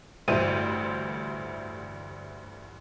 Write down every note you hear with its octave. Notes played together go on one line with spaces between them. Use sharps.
A1 D2 G2 E4 C5 D#7